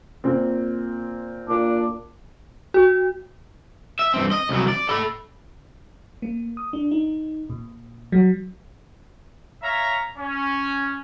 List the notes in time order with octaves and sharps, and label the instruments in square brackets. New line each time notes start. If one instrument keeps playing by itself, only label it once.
[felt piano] A#2 C4
[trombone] A#2 [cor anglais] D4
[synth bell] F#4
[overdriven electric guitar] E5
G2 C4
D#5
C2 F#3
D5
A4 B5
[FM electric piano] A#3
D#6
D4
D#4
A#2
F#3
[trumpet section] C#5 E5 F5 A#5
C#4